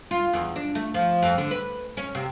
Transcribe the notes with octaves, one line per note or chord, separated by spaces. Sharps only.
F4
E2
D4
A3
F3
F2
D3
B4
C#4
C3